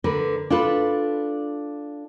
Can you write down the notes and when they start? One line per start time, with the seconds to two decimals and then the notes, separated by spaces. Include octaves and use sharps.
0.04 D3 A#4 B4
0.50 D4 F4 A4 B4